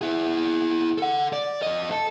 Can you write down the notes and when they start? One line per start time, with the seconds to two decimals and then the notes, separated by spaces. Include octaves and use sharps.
0.01 E4 G#4
0.98 A4 F#5
1.33 D5
1.62 F2 D#5
1.91 A4